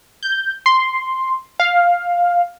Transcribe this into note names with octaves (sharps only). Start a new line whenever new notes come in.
G6
C6
F5